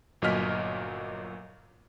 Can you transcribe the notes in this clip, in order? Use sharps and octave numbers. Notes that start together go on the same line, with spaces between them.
G1 A#2 F#3 D#5 F6 B6